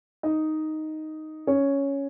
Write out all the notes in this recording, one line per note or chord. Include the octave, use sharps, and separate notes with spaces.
D#4 D#5
C#4 C#5